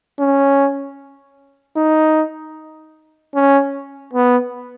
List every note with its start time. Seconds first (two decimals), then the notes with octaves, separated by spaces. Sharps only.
0.20 C#4
1.77 D#4
3.35 C#4
4.13 B3